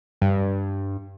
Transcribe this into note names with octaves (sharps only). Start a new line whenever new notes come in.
G2